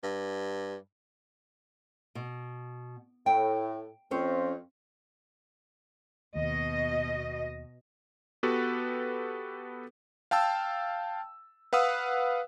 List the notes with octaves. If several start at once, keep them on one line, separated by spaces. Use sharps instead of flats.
G2
B2
A2 G5
F2 F3 C4 C#4 C5 C#5
D#2 B2 D#5
B3 F#4 G4 A4 B4
F5 G5 A5 E6
B4 F5 F#5 D#6 E6